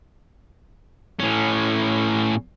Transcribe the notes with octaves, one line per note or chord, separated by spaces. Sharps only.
A2 C#4